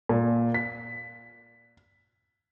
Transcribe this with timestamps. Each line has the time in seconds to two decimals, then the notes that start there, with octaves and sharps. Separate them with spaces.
0.09 A#2
0.54 B6